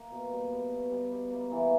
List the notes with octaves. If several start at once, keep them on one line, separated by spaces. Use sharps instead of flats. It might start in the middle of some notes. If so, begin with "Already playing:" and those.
Already playing: A#3
B2
G3
B2
B2
G3
B2
A#3
E3